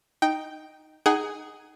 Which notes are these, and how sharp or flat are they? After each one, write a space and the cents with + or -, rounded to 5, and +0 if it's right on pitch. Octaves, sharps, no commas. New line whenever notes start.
D#4 +0 G5 +0
D#4 +0 G#4 +0 F#5 +30